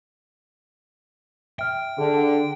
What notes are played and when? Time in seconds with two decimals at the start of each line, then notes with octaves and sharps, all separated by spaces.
1.59 E5 G5 F6
1.98 D3 G#4 A5